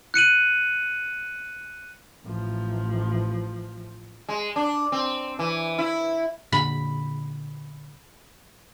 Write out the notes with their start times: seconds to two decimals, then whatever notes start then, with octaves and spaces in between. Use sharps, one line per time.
0.14 F#6 C#7 D#7 F#7
2.24 A1 F3
4.29 G#3
4.56 D4
4.92 C4
5.39 E3
5.78 E4
6.52 A#2 D3 B5